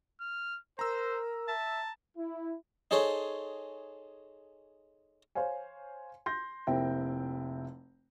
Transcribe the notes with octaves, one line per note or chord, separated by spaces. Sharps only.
F6
A#4 C5 A#5 E6
E5 A5
E4
D#4 G#4 A4 C5 C#5
C5 C#5 F5 G#5
C6 G6 A#6
F1 A#3 C4 E4 G5